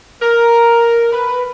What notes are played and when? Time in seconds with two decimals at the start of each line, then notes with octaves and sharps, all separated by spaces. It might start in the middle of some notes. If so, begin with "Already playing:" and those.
0.21 A#4
1.11 B4